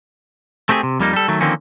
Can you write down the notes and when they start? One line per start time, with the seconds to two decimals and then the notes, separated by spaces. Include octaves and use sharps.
0.69 A3 C4 G4 G#4
0.83 C3
0.99 F2 G3 A#3 D#4
1.13 G3 A4
1.28 D#3 F#3 A3
1.41 D3 D#3 F3 A#3 C4 C#4